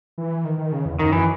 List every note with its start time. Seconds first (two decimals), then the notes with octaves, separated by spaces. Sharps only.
0.18 E3
0.45 D#3
0.58 D#3
0.72 C#3
0.86 E2
0.99 F#2 D#3
1.12 E3